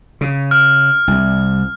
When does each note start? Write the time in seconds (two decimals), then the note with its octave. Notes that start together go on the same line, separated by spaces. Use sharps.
0.21 C#3
0.51 F6
1.08 C2